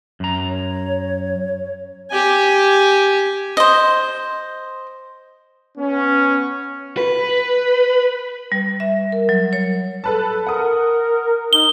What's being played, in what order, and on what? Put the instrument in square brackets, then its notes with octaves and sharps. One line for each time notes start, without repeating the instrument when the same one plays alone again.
[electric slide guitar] F#2 A#5
[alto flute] C#5
[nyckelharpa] G4 G#5
[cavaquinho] C5 D#5
[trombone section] B3 C#4
[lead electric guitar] B4
[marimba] G3
E5
A#4
F#3
C#5
[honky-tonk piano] A4 B4 A5
[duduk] A#4 [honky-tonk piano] F#5 D#6
[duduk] D#4 [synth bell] G7